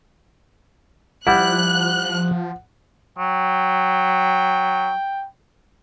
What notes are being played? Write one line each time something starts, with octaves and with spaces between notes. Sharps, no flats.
F3 G3 E4 F#5 F#6
F#3 G5